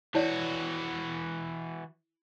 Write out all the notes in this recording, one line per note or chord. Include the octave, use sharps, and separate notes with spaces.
E3 E4 F#4 C#5 D5